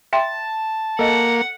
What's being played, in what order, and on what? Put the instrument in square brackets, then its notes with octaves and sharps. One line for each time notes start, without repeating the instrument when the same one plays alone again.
[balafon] E5 G5 C6 [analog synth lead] A5
[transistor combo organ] A#3 [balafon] A4 D#5 [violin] F#5